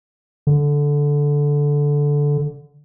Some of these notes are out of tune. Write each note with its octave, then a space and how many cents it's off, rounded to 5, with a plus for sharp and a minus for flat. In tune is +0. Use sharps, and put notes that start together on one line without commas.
D3 -10